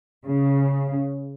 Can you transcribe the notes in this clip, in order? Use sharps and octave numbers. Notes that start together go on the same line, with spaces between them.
C#3